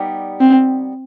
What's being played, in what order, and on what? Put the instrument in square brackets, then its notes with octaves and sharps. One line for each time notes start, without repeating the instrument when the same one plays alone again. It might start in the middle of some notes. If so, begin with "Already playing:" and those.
Already playing: [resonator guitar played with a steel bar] G3 B3 D#4 G4 D5
[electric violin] C4